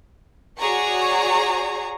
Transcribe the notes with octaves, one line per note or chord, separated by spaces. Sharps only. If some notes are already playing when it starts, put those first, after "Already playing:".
F#4 G#4 C#5 D5 A#5 C#6